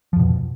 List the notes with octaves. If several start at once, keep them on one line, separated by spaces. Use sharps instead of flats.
F2 B2 F3